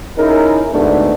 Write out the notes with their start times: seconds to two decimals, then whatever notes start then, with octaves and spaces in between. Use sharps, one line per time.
0.18 C#4 D#4 E4 G#4 A#4
0.72 D2 G#2 D3 A3 B3 D4